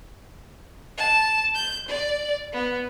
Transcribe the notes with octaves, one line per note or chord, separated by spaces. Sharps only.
A5
G6
D5
B3